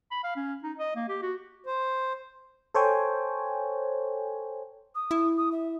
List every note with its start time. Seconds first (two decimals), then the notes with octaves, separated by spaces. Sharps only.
0.11 B5
0.24 F5
0.36 C#4
0.63 D#4
0.78 D#5
0.96 A#3
1.08 G4
1.23 F#4
1.66 C5
2.74 A4 C5 C#5 G5 G#5
4.94 D#6
5.11 E4
5.37 D#6
5.51 E5